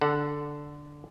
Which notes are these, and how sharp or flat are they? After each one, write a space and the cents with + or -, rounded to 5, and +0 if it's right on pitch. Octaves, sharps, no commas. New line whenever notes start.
D3 +0 A4 +0 F#5 +0